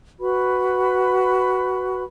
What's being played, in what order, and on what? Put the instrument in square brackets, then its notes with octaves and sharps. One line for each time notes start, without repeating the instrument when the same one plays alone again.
[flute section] F#4 B4 B5